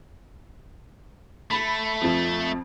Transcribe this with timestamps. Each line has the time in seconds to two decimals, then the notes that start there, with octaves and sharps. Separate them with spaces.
1.51 A3 B5
2.01 F2 F3